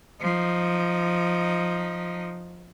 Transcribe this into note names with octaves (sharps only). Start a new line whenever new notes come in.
F3 D#4